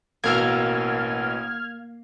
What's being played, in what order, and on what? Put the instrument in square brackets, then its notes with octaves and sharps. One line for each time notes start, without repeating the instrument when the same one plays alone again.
[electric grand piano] A1 B2 E6 [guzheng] A#3 [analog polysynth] F6 G#6